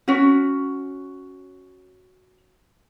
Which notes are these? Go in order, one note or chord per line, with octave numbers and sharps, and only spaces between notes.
C#4 F#4